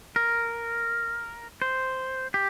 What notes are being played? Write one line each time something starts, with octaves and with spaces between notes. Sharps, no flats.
A#4
C5
G4